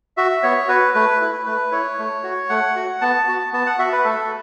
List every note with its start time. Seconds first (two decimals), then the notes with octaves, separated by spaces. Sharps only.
0.17 F#4 E5
0.43 B3 C#5
0.68 F#4 B4
0.94 A3 B4
1.21 E4
1.46 A3 B4
1.72 E4 C#5
1.99 A3
2.23 F#4
2.49 A3 F#5
2.76 F#4
3.01 B3 A5
3.28 F#4
3.53 B3 A5
3.66 F#5
3.79 F#4 E5
3.93 B4
4.05 A3 A4